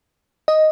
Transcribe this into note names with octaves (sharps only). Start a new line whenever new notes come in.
D#5